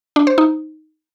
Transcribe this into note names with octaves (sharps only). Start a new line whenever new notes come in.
D4
C5
D#4